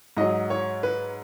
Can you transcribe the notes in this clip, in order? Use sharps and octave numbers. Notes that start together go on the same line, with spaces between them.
G#2 F#3 D#5
C#5
B4